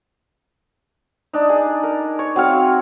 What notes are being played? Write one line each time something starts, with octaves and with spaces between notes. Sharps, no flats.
D4 D#4
G#4
A#4
C#5
F#3 C4 C#5 F5